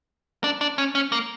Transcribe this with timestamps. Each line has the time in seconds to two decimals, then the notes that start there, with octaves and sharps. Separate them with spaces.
0.44 D4
0.61 D4
0.78 C#4
0.95 C#4
1.12 A#3